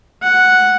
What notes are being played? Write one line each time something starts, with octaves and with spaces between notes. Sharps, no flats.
F#5